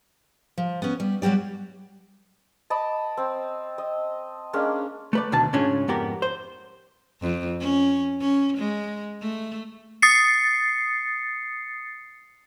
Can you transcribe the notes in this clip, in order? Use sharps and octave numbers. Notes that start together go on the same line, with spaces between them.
F3
B3 C#4
G3
F#3 G3 F#4 G4 D5
D#5 A5 B5 D6
C4
D#5
G#3 A#3 C#4 D4
A3 B4 D5
D2 B2 D#3 D4 A5
G#2 C#3 C#4 D4 F4
F2 G#2 B3 G4 A#4
C5
F2
C#4
C#4
G#3
A3
D#6 A6 C7 C#7